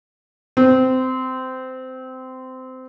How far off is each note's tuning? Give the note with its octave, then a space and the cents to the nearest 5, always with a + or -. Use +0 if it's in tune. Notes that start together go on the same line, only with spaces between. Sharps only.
C4 -20